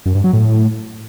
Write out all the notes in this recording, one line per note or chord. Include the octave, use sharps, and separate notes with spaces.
F#2
G2
F#3
A2